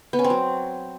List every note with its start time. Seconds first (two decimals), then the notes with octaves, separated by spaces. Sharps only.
0.13 B3
0.19 C#4
0.24 C4
0.30 F#3